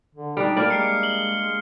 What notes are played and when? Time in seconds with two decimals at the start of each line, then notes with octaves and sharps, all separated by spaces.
0.15 D3
0.37 G3 D4 D#4
0.56 G3 A#3 D5
0.70 G#3 F6 C7 C#7
1.03 F#7 G7
1.37 G#3